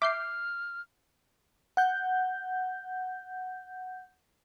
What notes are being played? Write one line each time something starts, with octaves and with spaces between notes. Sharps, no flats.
E5 D6 F6 G6 C7
F#5 G6